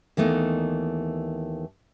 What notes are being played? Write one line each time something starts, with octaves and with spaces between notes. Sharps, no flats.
D#2 E3 A3 B3 D#4